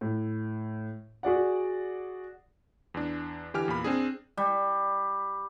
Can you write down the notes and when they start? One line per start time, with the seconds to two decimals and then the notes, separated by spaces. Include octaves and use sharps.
0.01 A2
1.23 F#4 G#4 D5 F#5
2.94 E2 D4
3.54 D3 E3 G4 G#5 F6
3.68 E2 A#2 B5
3.84 C4 D4 G#4
4.37 G3